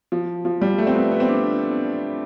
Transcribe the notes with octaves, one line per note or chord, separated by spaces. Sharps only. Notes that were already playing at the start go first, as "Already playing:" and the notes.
F3
F3
G3
A3
C4
B3
B3
C4
D4